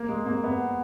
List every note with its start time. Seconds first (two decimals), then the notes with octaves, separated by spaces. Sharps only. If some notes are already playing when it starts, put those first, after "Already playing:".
Already playing: A#3
0.08 G#3
0.25 A#3
0.44 B3